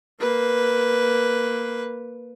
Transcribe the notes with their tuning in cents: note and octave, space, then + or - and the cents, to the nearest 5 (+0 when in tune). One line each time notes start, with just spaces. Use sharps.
A#3 +0 B4 +0